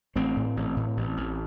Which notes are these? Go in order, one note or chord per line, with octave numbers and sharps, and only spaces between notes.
A1 A3 C4
A2
A1
A2
A1
A1